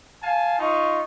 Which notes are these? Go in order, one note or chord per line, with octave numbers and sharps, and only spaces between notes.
F5 G#5 A5
D#4 F4 C#6